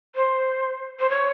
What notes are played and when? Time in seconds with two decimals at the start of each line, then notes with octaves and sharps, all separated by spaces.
0.15 C5
0.99 C5
1.10 C#5